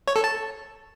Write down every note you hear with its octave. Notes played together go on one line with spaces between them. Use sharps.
C#5
A4
A5